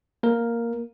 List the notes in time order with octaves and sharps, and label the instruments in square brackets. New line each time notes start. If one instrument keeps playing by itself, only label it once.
[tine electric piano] A#3 A#4